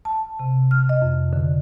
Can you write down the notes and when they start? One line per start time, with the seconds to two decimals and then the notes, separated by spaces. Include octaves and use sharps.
0.05 A5
0.39 C3
0.71 F6
0.89 D#5
1.02 F2
1.33 D3